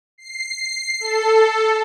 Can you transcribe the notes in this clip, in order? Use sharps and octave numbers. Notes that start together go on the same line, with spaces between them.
C7
A4